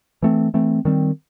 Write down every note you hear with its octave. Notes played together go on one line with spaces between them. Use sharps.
E3 A3 C4
E3 A3 C4
D#3 G3 C4